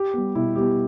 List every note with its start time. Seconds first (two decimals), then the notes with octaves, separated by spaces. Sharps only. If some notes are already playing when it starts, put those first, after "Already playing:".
Already playing: G4
0.14 G3 B3
0.35 B2 E4
0.56 G3 B3 G4